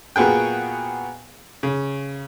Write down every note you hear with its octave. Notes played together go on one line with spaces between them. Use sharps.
A#2 B3 F#4 G#4 G5
C#3